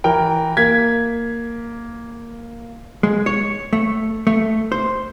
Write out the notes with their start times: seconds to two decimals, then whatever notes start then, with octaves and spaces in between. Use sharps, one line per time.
0.04 E3 A#4 G5
0.57 A#3 G#6 B6
3.03 G#3
3.26 C#5
3.73 A3
4.27 A3
4.72 C5